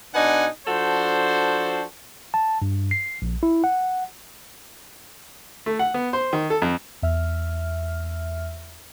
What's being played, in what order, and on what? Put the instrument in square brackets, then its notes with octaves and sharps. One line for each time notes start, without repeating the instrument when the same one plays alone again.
[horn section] B2 D4 D#4 B4 F#5 G#5
F3 D4 F#4 A4 C5
[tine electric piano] A5
G2
C7
A#1
E4
F#5
[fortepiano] A3
F#5
B3
C5
D#3
A4
F2
[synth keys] E2 E5 F6